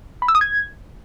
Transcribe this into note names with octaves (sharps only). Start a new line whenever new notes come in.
B5
E6
D#6
G#6